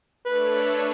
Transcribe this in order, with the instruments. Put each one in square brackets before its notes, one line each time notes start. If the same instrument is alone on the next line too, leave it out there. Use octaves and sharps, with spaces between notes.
[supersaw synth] A3 D4 A4 C#5 [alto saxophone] B4